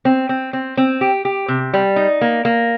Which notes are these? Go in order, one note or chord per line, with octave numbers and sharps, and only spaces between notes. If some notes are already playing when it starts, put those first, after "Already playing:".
C4
C4
C4
C4
G4
G4
C3
G3
D#4
A#3
A#3